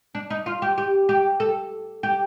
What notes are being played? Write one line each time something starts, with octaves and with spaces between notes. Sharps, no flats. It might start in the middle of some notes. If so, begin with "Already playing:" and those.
D4
D#4
F4
G4
G4
G4
A4
G4